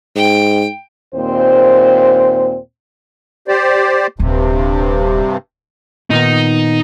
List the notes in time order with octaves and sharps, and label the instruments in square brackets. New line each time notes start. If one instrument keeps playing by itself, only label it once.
[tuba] G#2 [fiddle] G5
[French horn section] D#2 A#2 C4 C5
[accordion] G4 C5 D5
[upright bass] D#1 D#3 [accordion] G2 C3
[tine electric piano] A#2 D#3 B3 [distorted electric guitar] D#4